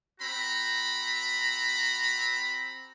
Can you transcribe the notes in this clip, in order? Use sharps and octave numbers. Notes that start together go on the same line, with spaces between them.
C4 F#4 A#5 B5